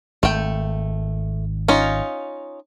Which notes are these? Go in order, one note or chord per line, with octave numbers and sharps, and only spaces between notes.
G#1 A3 G5
C#4 D#4 F4